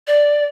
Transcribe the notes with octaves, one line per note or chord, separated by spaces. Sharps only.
D5